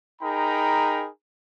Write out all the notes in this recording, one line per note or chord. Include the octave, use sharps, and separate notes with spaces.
D#4 G#4 A#4 G5 A#5 B5